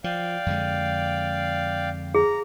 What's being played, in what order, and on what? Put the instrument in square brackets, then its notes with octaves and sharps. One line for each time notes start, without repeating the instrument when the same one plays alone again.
[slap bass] F3 [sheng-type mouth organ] D5 F5 G5
[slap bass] F2 D3 G#3
[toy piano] G#4 [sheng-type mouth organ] A#5